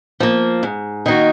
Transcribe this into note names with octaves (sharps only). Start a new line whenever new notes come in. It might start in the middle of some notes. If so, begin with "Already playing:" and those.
F3 A#3
G#2
D#3 A#3 D#4 F#4